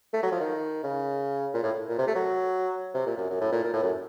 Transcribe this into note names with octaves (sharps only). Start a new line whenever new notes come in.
A3
F#3
F3
D#3
C#3
A#2
A2
A#2
C3
A3
F#3
C3
A#2
F#2
F#2
A2
A#2
A#2
A2
F#2